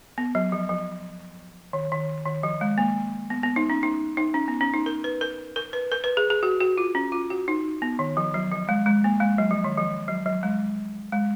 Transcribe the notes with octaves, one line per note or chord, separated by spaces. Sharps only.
B3
F#3
F3
F3
D#3
D#3
D#3
F3
G#3
A#3
B3
B3
D#4
C#4
D#4
D#4
C#4
B3
C#4
D#4
A#4
B4
A#4
A#4
B4
A#4
B4
G#4
G#4
F#4
F#4
F4
C#4
F4
F#4
D#4
B3
D#3
F3
F#3
F3
G#3
G#3
A#3
G#3
F#3
F3
D#3
F3
F#3
F#3
G#3
G#3